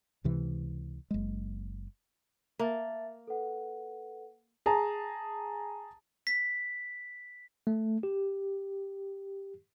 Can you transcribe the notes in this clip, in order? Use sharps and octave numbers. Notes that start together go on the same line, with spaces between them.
C#2 C3 E3
F#1 G#3
A#3 E5 A5 A6
A4 B4 F#5
G#4 A5 A#5
B6
A3
G4